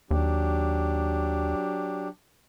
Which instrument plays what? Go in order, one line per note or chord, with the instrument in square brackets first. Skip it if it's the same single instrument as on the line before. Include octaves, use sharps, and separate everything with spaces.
[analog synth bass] D#2 [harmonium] F#3 D4 G4